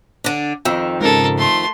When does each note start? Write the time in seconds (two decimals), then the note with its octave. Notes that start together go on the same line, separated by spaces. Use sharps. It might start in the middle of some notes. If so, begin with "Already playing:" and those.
0.24 D3 D4
0.65 F2 D#3 G5 E6
1.01 G#2 C#3 A4 A#4
1.37 A3 C6